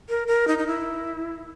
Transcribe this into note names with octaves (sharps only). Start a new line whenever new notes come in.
A#4
A#4
D#4
D#4
E4